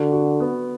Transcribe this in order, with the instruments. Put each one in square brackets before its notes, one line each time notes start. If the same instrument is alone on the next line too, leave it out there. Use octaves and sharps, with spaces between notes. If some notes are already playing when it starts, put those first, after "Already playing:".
Already playing: [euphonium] D3 [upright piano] F#4
[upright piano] F#4
B3